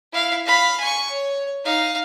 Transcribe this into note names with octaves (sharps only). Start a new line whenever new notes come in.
E4 F5
F5 B5
G#5 C#6
C#5
D#4 F5